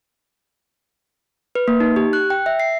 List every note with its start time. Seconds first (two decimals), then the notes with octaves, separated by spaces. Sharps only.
1.55 B4
1.68 A#3
1.80 D#4
1.96 G4
2.13 F#6
2.30 G5
2.46 E5
2.60 C7